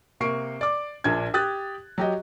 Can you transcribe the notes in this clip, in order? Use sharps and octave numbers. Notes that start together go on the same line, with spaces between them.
C3 A#3 C#6 C7 D7
D5 D6
A#1 A#2 D4 G#6
G4 D#6 F#6 A6
F#3 G4 D#5